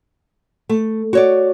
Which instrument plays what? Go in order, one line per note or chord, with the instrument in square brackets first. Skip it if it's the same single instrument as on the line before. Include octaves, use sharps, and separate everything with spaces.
[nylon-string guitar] A3
F#4 C#5 D5